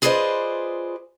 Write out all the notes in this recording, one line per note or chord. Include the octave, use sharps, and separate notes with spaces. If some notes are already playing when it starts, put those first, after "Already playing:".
F4 G#4 B4 C5 D5 D#5